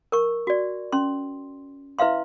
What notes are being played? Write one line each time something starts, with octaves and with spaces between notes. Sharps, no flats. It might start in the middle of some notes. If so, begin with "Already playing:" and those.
A#4 C#6
F#4 D5
C#4 C6
E4 B4 E5 F5 C6